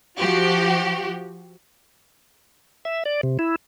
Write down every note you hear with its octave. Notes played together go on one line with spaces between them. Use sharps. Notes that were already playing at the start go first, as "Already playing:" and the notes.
F3 F#4 G4
E5
D5
C3
E4